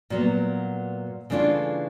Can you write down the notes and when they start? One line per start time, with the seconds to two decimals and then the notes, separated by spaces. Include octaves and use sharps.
0.10 A#2 F#3 B3
1.30 C#3 E3 A3 D4 F4